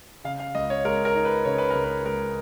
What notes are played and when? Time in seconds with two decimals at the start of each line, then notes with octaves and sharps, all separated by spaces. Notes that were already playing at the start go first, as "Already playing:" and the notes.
0.24 C#3 F5
0.40 F5
0.55 C#2 D#5
0.70 C#5
0.85 G#3 A#4
1.05 A#4
1.15 D#4
1.25 B4
1.45 C#3 C#5
1.58 B4
1.71 C#2 A#4
1.84 B4
2.05 G#3 A#4